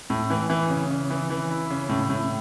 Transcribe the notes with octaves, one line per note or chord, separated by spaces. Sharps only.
A2
E3
E3
C#3
C#3
E3
E3
E4
C#3
A2
A2